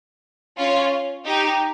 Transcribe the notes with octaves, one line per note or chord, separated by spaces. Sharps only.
C#4 F4
D#4 G4